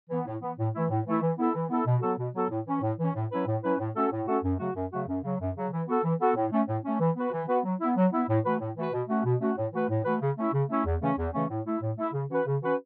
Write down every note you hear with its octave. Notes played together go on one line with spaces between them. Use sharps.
E3 B3
A2
E3 B3
A2
E3 A3 E4
A2
E3 A3 E4
E3
B3 E4 A4
E3
B3 E4 A4
B2
F#3 B3 F#4 A4
B2
F#3 B3 F#4 A4
A2
E3 C#4
A2
E3 C#4
A2
F#3 C#4 E4 B4
A2
F#3 C#4 E4 B4
A2
A3 C#4 F#4 A4
A2
A3 C#4 F#4 A4
F#2
C#3 F#3 A3 F#4
F#2
C#3 F#3 A3 F#4
F#2
C#3 F#3
F#2
C#3 F#3
E3
B3 F#4 A4
E3
B3 F#4 A4
A2
A3 C#4
A2
A3 C#4
E3
B3 F#4 B4
E3
B3 F#4 B4
F#3
B3 E4
F#3
B3 E4
A2
E3 A3 F#4 B4
A2
E3 A3 F#4 B4
B2
A3 C#4 F#4
B2
A3 C#4 F#4
A2
E3 A3 F#4 B4
A2
E3 A3 F#4 B4
C#3
A3 C#4 E4
C#3
A3 C#4 E4
E2
C#3 E3 A3 C#4
E2
C#3 E3 A3 C#4
A2
A3 E4
A2
A3 E4
C#3
E3 C#4 F#4 B4
C#3
E3 C#4 F#4 B4